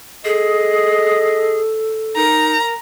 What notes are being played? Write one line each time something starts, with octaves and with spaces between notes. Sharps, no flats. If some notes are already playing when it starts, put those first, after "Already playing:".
G#4 A4 D#5
D#4 A#4 A#5